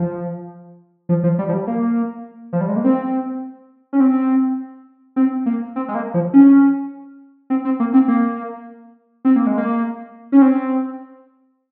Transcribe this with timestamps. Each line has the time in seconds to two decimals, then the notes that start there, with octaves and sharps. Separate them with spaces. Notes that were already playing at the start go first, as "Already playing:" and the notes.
Already playing: F3
1.09 F3
1.24 F3
1.39 G3
1.49 F3
1.53 G3
1.67 A#3
2.53 F3
2.61 G3
2.69 G#3
2.76 A#3
2.84 C4
3.93 C#4
4.00 C4
5.16 C4
5.46 A#3
5.76 C4
5.88 G#3
5.95 A#3
6.14 F3
6.34 C#4
7.50 C4
7.65 C4
7.80 A#3
7.93 C4
8.08 A#3
9.25 C4
9.36 A#3
9.47 G#3
9.58 A#3
10.32 C#4
10.42 C4